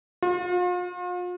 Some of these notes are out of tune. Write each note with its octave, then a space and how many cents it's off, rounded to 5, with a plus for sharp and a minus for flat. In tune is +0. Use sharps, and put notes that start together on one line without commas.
F4 +40